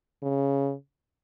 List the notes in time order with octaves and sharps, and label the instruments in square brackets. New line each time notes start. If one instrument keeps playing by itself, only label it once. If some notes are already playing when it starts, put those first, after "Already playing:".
[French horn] C#3